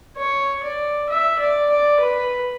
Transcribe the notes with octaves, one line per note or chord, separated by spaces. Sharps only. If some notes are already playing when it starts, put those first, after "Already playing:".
C#5
D5
E5
D5
D5
B4